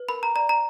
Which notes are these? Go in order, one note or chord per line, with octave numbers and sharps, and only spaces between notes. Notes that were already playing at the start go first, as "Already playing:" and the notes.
Already playing: B4
A#4 B5
A#5
D5 A#5
A#5